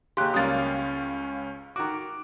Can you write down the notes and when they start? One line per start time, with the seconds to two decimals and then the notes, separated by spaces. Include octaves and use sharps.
0.17 D#2 C#3 G4 C6 F#6
0.34 C#2 G3 A#3 C#4 F5 D#6 A6
1.76 D#3 F#4 D6